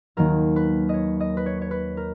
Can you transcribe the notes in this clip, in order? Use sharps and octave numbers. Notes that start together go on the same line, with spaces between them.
D#2 D#3 F#3 A#3 A#4
B4
C#5 D#5
D#5
B4
C#5
C#5
B4
A#4